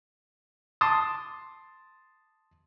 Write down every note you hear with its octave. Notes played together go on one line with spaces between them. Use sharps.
A5 C6 D6 D#6